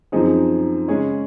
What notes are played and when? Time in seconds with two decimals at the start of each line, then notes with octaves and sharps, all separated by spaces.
0.12 F#2 F3 C4 D#4 G#4
0.88 C#3 G#3 C#4 G#4 C#5